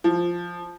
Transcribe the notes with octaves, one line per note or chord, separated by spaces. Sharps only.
F3